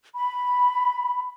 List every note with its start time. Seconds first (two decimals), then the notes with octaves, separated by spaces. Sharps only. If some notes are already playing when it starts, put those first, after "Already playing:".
0.15 B5